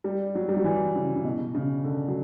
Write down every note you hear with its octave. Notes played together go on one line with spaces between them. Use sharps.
G3
F#3
G3
F#3
E3
C#3
C#3
B2
C#3
D3
F#3